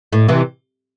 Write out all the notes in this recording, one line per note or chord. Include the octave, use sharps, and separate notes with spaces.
A2
C3 E3